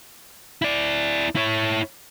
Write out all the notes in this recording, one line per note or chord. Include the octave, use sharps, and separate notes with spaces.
E4 D5
E4 C#5